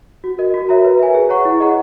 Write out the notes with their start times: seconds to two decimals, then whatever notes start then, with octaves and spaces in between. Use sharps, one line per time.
0.24 F#4
0.39 A#4 D#5
0.54 F#4
0.69 A#4 C#5 E5 A#5
0.84 B4
0.99 E5 G#5
1.14 G#4
1.29 C#5 F#5 A#5 C#6
1.45 E4
1.60 G#4 D#5 F#5 A#5